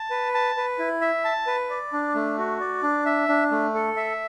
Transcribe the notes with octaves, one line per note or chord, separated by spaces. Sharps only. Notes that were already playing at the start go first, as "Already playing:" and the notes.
Already playing: A5
B4
A5
B4
E4
E5
A5
B4
D5
D4
A3
F#4
D5
D4
E5
D4
A3
A4
E5